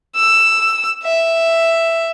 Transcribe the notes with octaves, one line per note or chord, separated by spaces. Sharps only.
E6
E5